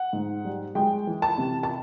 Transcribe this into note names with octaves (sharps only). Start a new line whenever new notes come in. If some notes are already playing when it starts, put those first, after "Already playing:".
Already playing: F#5
G#2
G3
G#3 G5
E3
A5
C3
A5